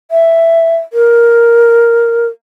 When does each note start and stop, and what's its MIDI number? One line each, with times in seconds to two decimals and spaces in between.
0.11 0.77 76
0.93 2.27 70